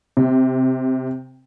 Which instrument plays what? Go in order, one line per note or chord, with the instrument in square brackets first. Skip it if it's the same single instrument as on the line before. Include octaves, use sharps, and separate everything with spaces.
[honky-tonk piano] C3